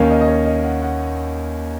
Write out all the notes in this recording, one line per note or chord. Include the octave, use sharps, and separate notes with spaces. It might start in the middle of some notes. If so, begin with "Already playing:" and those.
Already playing: D#2 D#3 A#3 C#4 F5
D#5
D#5
C#5
D#5
F#5
F#5